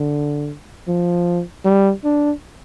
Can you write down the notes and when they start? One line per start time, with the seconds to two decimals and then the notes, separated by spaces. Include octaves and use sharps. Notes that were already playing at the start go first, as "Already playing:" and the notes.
Already playing: D3
0.88 F3
1.65 G3
2.04 D4